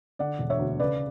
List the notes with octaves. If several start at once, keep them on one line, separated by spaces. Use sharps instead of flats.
D3 D5 F#5
E1
C#5 E5
D2
C#3 B4 D5